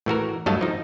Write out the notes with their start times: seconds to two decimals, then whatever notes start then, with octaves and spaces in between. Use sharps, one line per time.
0.06 A2 E3 F#4 A#4
0.46 G2 F#3 A3 D#5 F5 A5
0.61 F3 D#4